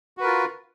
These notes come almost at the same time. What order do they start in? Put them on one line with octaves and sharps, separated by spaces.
F#4 B4 A#4 F4